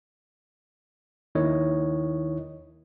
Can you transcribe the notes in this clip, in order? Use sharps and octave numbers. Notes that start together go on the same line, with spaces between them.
D#2 D#3 E4 C#5 D#5